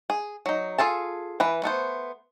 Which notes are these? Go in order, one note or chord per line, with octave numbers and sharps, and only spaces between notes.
G#4
F#3 D#4
F4 G#4 A4 A5
E3 B4 B5
A3 B3 C5